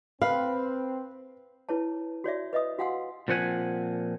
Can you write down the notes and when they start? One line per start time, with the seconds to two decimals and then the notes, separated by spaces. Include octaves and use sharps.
0.22 C4 B4 F5
1.69 E4 B4 C#5 A5
2.24 F#4 C#5 D5 E5
2.53 B4 D#5 E5 D#6
2.79 F#4 F5 F#5 G#5 C6 E6
3.28 A#2 F3 C4 F#5 G#5